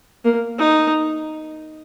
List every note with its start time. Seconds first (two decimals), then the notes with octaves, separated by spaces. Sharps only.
0.24 A#3
0.58 D#4